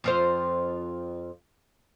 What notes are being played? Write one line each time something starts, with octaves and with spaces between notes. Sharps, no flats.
F2 F4 C5